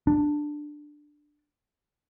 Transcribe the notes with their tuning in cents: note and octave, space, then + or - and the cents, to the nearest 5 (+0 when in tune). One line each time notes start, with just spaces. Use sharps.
D4 +10